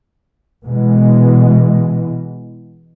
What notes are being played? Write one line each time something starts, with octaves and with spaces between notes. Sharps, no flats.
B2 E3 G#3